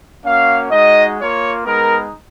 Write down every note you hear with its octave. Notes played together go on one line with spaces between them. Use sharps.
A#3 C#4 F#4 F5
G#3 D#4 F#4 D#5
A#3 F4 C#5
G#3 B3 D#4 A#4